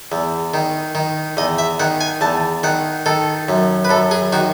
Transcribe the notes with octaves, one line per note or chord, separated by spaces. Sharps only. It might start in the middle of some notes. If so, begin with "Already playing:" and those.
E2
D#3
D#3
E2 D#5
E5
D#3 F#5
G#5
E2 A5
D#3 F#5
D#3 A4
F#2
B4
F#2 A4
G#4
D#3 F#4